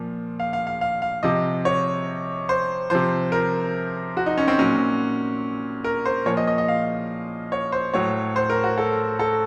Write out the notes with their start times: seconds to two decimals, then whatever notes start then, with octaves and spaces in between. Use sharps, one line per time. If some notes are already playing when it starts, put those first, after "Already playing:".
Already playing: A#2 F3
0.40 F5
0.53 F5
0.67 F5
0.81 F5
1.02 F5
1.23 C3 F3 D#5
1.65 C#5
2.49 C5
2.90 C3 F3 C5
3.32 A#4
4.17 F#4
4.26 D#4
4.38 C#4
4.48 C4
4.59 A#2 F#3 C#4
5.84 A#4
6.05 C5
6.26 A#2 F3 C#5
6.37 D#5
6.47 D#5
6.58 D#5
6.68 F5
7.52 C#5
7.72 C5
7.94 A2 F#3 C#5
8.36 C5
8.50 A#4
8.63 F#4
8.78 A4
9.19 A4